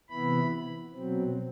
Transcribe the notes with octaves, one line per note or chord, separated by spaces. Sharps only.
C3 E3 B3 E4 B5
B2 F#3 C4